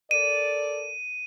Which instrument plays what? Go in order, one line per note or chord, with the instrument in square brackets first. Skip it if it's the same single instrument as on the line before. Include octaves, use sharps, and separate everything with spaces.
[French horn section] A4 A#4 D5 [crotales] D#7